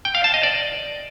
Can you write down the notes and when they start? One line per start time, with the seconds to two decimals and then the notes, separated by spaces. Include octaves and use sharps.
0.05 G5
0.15 F5
0.24 A5
0.34 D#5
0.43 D5